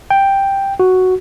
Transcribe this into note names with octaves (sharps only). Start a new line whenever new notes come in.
G5
F#4